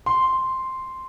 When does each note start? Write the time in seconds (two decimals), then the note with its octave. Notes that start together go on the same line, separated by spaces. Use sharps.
0.06 C6